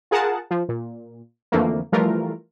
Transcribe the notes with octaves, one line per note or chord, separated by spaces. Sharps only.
F4 G#4 A#4 F#5 A5
F3
A#2
F2 D3 E3 F3 A3 A#3
E3 F3 G3 A3 F4 A#4